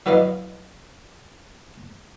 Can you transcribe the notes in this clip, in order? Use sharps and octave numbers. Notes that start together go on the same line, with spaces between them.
F#3 E4 B4 D5 D#5 F5